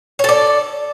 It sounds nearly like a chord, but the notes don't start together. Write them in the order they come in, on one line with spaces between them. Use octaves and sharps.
C#5 A4 D5